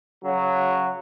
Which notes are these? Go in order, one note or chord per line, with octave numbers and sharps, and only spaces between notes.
C#3 F#3